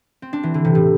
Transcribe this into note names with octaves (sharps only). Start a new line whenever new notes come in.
C4
D4
E3
D3
C3
A2